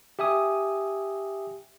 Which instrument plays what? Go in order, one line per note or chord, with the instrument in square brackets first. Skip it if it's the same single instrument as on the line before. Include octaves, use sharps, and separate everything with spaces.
[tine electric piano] G4 E5 G#5 D#6